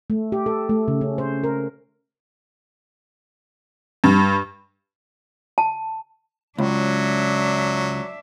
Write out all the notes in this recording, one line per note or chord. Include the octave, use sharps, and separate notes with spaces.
A3
G4
A4
A3
C#3
C#4
C5
A#4
G2
A5
C#2 F#3 D4 E5